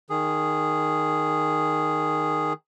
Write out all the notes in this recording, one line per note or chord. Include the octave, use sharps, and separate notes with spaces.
D#3 G#4